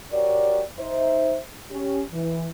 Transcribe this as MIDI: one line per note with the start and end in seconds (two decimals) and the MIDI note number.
0.12 0.62 66
0.12 0.62 67
0.12 0.62 70
0.12 0.62 73
0.12 0.62 74
0.79 1.38 63
0.79 1.38 72
0.79 1.38 76
1.71 2.01 61
1.71 2.01 67
2.13 2.48 52